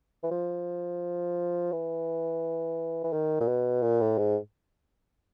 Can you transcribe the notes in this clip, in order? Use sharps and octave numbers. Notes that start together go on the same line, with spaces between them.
E3
F3
E3
E3
D#3
A#2
B2
A#2
A2
G#2